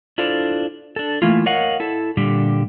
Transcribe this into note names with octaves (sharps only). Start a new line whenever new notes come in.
D4 E4 F4 A4 C5 D5
D4 A4
E3 A3 A#3 E4 F4
A#4 C#5 D#5 F5 F#5
E4 A4
A#2 D3 G3 G4